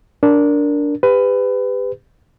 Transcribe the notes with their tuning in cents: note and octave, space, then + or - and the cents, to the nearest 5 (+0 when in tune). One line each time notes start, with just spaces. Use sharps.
D4 -15 A#4 +0
G4 +35 B4 +25